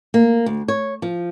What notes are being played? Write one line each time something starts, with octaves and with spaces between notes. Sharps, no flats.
A#3
D2
C#5
F3